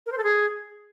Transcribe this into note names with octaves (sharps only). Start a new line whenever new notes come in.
A#4
C5
A4
G#4